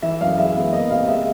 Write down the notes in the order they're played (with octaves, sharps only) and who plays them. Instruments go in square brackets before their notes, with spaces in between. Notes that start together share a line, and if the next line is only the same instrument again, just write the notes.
[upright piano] E3 E5
F#2 F5
G#3 E5
B3
A#3 D#5
C3 F5
G#3 E5